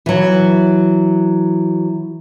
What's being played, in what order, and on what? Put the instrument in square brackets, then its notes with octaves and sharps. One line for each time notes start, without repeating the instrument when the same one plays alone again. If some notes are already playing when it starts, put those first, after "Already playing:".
[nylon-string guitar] E3 F#3